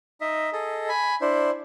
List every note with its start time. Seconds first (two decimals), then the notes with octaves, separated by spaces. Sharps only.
0.21 D#4 D#5 E5
0.53 G#4 A4 D#5
0.89 G#5 B5
1.21 D4 E4 C5